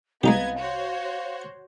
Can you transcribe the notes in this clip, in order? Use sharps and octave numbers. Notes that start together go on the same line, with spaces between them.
C2 G#3 B3 D#4 G4 D#5 F5 G#6
F#4 C5 C#5